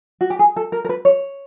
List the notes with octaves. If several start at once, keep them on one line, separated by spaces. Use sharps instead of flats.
F#4
G4
G#4
A4
A#4
A#4
B4
C#5